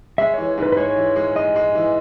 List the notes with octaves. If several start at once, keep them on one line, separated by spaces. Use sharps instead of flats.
G#3 E5
E3 C#5
G#2 B4
B4
G#3 C#5
E3
G#3
G#3 D#5
G#3
E3